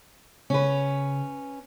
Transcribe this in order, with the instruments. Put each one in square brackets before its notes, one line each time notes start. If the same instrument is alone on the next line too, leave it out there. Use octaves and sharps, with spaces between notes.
[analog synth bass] C#3 [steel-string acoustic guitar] C#4 B4